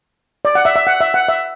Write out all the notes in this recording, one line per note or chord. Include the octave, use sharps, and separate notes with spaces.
D5
F#5
E5
E5
F#5
E5
F#5
E5